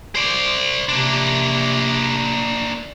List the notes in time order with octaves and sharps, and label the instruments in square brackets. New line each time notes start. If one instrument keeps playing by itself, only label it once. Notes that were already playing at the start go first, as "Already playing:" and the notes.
[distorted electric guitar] C5 D5
[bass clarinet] C3 [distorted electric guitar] A#3 D4